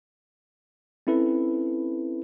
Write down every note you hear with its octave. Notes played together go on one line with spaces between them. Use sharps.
C4 C#4 E4 A4 B4